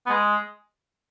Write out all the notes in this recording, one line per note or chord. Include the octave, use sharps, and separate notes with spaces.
B3
G#3